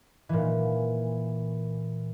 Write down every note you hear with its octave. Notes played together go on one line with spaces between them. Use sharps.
A#2 E3